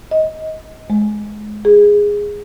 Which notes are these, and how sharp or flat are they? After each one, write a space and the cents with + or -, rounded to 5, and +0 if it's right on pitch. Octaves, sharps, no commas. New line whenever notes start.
D#5 +15
G#3 +20
G#4 -10